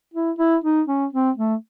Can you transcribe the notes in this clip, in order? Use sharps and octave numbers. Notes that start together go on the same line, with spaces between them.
E4
E4
D#4
C#4
C4
A3